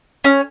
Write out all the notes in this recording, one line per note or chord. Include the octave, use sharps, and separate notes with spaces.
C#4